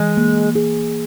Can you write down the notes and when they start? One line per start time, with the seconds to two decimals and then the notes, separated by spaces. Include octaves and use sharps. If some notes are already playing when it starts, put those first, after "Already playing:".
Already playing: E3 G#3
0.17 A#3
0.55 G#4